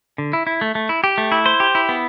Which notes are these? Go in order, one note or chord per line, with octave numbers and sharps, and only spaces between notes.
D3
E4
E4
A3
A3
E4
G4
A3
E4
C5
G4
E4
B3